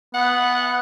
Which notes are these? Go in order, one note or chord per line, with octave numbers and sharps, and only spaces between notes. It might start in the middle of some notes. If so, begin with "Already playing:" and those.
B3 F#5